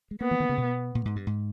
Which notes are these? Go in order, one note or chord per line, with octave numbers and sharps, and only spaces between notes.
G#3
A#3 B3
E3
D#3
C#3
B2
A#2
G#2
G2
G#2